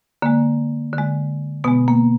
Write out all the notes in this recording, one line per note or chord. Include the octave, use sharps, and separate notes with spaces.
D3 G#3 A#3
D3 G#3
B2 G#3 B3
A#3